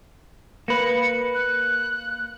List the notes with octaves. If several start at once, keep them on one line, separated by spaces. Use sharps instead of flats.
A#3 B4 C#7
F#6